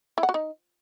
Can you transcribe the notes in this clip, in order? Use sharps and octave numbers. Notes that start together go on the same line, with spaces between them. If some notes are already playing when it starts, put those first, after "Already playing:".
E4
F#5
F#4
D#4